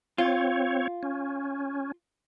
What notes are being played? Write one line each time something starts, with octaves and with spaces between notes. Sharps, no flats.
C4 F4 C#5
C#4